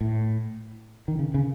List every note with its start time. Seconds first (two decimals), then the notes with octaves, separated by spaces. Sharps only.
0.01 A2
1.08 D#3
1.19 C#3
1.34 C#3